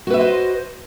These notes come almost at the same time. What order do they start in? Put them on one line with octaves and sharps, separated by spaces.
F#4 B4 E5 D#5 C5